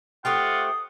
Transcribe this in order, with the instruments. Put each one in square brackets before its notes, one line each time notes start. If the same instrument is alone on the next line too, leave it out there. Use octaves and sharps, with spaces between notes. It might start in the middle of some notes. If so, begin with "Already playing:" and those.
[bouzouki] A3 C4 G4 [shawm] F4 [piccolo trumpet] F#5 [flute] D#6